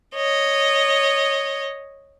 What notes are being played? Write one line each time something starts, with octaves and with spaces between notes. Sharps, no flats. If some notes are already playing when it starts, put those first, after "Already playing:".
C#5 D#5